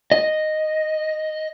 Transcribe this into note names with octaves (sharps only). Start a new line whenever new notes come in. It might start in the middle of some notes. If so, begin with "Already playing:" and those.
D#5